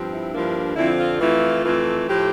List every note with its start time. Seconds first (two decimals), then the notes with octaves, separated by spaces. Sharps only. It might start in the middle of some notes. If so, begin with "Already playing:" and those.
Already playing: G2 F3 C4
0.10 E4
0.32 G2 F3 A#3 D4
0.75 F2 D3 F3 C4 E4
0.98 F4
1.20 F2 E3 A3 E4
1.64 F2 E3 A3
2.08 A2 F3 A3 G4